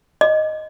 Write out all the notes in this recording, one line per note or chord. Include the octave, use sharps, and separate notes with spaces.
D#5